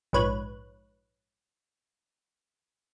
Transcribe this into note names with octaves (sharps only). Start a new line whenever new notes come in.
A#1 G#2 B4 C#5 F#6